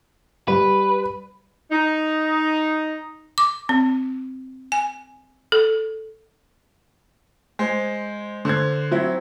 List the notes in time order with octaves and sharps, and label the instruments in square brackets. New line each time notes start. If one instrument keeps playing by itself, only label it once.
[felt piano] G3 [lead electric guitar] B4
[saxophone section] D#4
[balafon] D6
C4
G#5
A4
[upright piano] G#3 C5
D3 C5 G#6
F#3 C4 E4